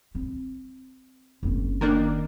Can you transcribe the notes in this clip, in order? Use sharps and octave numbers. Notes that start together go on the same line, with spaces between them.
C4
F#1 C4
D#3 A#3 D4